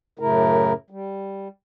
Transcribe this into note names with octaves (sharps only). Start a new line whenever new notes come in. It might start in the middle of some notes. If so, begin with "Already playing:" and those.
F#2 A2 C#3 A3 E4 A#4
G3